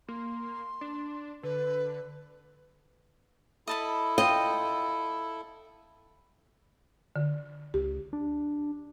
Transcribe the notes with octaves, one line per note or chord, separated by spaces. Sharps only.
A#3 C6
D4
D3 B4
E4 A4 D#5 A5 B5
F4 D#5 G5
D3
C#2 G4
D4